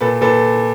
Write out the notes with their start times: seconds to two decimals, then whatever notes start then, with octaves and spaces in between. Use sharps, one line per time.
0.01 A#2 A4 B4
0.21 A#2 A4 B4